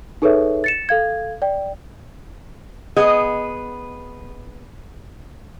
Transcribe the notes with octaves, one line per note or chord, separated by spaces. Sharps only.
D#4 G#4 A4 B4 C#5 E5
A6 C#7 E7
A4 F5 G#6
D5 G5
B3 G#4 D#5